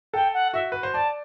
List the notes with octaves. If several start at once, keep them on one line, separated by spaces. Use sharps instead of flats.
A4 G5
F#5
F#4 E5
B4
C5
D5 A5